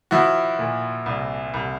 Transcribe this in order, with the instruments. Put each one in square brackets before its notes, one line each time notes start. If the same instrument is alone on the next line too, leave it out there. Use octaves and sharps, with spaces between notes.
[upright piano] F3 E4 F#4
A#2
C2
C2